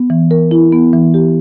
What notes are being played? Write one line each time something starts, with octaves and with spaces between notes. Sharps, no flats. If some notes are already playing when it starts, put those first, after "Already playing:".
Already playing: B3
E3
A#4
E4
B3
E3
G4